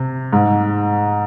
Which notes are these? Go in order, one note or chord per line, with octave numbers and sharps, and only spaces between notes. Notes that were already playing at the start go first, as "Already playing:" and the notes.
Already playing: C3
G#2